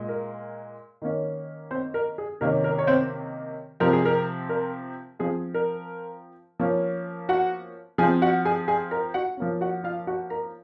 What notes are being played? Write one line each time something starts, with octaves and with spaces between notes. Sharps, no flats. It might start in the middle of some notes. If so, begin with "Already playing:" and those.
Already playing: A#2 G#3
A#4
D#3 A#3 C#4
C4 C5
A#4
G#4
C3 D#3 A#3 C#4 A#4
A#4
C#5
C4 C5
C3 F3 C4 A#4
G#4
A#4
A#4
F3 C4 G#4
A#4
F3 A#3 C#4
F#4 F#5
F3 C4 G#4 G#5
F#4 F#5
G#4 G#5
G#4 G#5
A#4 A#5
F#4 F#5
F3 A#3 C#4
F#4 F#5
F4 F5
F#4 F#5
A#4 A#5